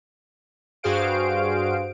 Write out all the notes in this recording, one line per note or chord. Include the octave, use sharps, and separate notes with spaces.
G2 F#4 G#4 C5 F5 D7